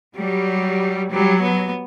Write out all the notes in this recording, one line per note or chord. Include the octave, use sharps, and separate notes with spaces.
F#3 G3
F#3 G3
B3